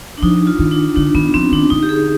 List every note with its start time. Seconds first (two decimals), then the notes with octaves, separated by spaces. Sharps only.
0.18 D4
0.22 F3 D#4
0.47 F4
0.59 D#3
0.71 D4
0.96 D3 D4
1.14 D#3 B3
1.34 F3 C4
1.52 D#3 D4
1.70 D3 D#4
1.83 G4
1.89 G#4